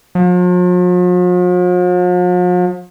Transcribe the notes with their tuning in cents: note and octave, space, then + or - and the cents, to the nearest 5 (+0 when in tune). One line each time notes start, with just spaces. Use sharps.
F3 +45